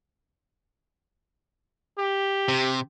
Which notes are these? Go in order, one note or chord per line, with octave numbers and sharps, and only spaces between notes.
G4
C3